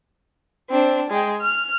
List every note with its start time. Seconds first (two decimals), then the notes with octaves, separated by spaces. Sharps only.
0.70 C4 D4
1.10 G#3 G5
1.41 F6